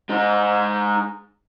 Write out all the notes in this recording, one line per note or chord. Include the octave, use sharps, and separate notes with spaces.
G#3 D#4